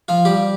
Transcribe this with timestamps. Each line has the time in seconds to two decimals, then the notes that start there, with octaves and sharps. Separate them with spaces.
0.08 F3 F4
0.25 G3 G4